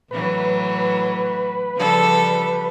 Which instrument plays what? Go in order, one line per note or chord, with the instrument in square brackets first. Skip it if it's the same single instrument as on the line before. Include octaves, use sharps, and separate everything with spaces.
[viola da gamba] A2 E3 F#3 [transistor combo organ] B4
[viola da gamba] C#3 F3 G3 [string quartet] A4